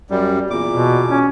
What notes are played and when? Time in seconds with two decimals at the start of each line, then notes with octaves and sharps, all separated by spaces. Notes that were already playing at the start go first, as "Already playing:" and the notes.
0.10 F#2 G3
0.50 E2 A#2 D6
0.70 B2
1.10 C#4